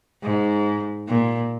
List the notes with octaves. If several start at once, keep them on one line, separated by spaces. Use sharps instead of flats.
G#2
A#2